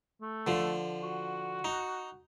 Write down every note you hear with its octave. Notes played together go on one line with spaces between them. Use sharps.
A3
D3 F3
F#4
D#4